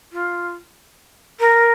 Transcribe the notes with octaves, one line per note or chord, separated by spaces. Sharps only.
F4
A#4